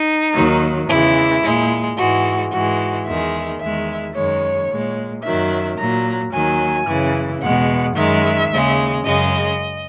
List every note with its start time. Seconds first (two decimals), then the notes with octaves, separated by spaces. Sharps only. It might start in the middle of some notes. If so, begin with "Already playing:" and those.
Already playing: D#4
0.34 D#2 D#3 F#3
0.89 E2 C#3 E3 G#3 E4
1.43 A#2 G#3
1.98 G#2 E3 G#3 F#4
2.52 G#2 E3 G#3 F#4
3.06 E2 D#3 G#3 E5
3.61 E2 D#3 G#3 E5
4.15 F#2 D#3 G#3 C#5
4.69 A#2 G#3
5.24 F#2 D#3 F#3 E5
5.78 A#2 F#3 A#5
6.32 D#2 D#3 F#3 G#5
6.87 F#2 C#3 E3
7.41 E2 B2 G#3 F#5
7.96 F#2 D#3 G#3 E5
8.50 D#2 C#3 G#3
9.05 F#2 C#3 G#3 D#5